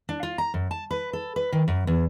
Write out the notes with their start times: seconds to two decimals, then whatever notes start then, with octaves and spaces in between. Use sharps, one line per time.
0.09 D4
0.23 F4
0.38 A#5
0.54 F#2
0.71 A5
0.91 B4
1.13 A4
1.36 B4
1.52 D#3
1.68 F#2
1.87 E2